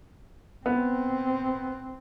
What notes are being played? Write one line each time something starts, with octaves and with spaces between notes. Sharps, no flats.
B3 C4